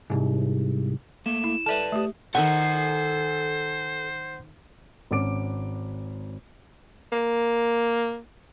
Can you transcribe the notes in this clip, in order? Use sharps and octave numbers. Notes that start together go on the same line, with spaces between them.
C2 F2 G#2
A3 A#3 E7
E4
A4 B4 D5 E5 A5
A3 G4
D#3 A4 C5 E5 F#5 G#5 C#6
G#1 C#4 D6 D7
A#3